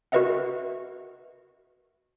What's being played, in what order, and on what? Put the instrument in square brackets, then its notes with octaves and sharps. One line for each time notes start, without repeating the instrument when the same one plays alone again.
[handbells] F#4 A#4 B4 D#5 E5 F#5